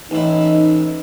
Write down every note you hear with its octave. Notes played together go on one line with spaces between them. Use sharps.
A1 D#4 E4